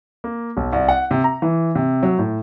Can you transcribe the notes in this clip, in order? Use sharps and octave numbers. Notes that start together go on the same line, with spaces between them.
A#3
B1
C2
F#5
C3
A#5
E3
C3
F#3
A2